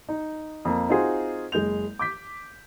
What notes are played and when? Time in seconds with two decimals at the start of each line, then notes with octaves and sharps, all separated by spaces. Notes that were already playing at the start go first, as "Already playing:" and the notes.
0.09 D#4
0.65 F2 A#3
0.89 C4 D#4 F4 F#4 G#4 C5
1.52 F#1 G#3 G6 F7
1.99 D6 G6 B6